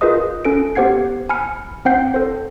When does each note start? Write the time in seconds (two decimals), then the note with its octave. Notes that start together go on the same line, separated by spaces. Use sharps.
0.01 F4 G#4 A#4 B4 D#5 D#6
0.45 C#4 A4 D7
0.75 B3 G4 C5 F#5 G#6 C7
1.29 G#5 B5 F6 C#7
1.85 C4 C5 F#5 G5 G6 C7
2.14 A4 C5